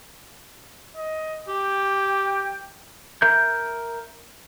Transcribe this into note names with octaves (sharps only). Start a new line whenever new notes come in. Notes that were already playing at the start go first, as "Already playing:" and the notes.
D#5
G4 G5
A#4 E5 A#5 G6